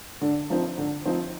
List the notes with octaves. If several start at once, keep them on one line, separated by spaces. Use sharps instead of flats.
D3
F3 C4 D#4
D3
F3 C4 D#4